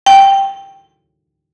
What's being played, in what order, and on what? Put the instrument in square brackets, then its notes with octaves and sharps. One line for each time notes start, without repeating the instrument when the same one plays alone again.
[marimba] G5